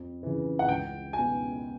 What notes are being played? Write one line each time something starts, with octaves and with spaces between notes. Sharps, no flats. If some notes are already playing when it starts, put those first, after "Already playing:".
Already playing: F2
C#3 E3
F#5
C#2 G5
B2 F#3 G#5